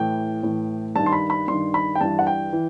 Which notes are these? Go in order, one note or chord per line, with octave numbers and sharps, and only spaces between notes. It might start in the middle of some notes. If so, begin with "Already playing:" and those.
Already playing: A2 E3 G5
A2 E3
G2 D#3 A5
C6
B5
B5
G2 D#3 C6
B5
G5
G2 E3 A5
F#5
G5
E3